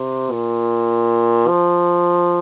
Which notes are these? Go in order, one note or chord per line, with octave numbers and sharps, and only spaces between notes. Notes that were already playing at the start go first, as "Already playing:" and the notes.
Already playing: C3
A#2
F3